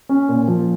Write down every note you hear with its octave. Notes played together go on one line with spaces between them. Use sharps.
C#4
A#2
F3